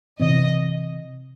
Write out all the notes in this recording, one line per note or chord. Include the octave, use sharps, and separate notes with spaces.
C3 E3 C4 D#5